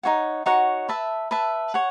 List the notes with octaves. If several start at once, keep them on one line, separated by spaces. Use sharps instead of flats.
D#4 F#4 C#5 F#5
D#4 F#4 C#5 F#5
B4 E5 A5
B4 E5 A5
C#5 F#5